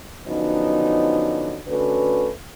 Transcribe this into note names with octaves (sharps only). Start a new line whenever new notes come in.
D3 F3 F#3 B3 C#4 D#4
D3 A3 C#4 F#4 B4